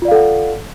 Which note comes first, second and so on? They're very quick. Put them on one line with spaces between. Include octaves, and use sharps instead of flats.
F4 D5 F5 A4 F#5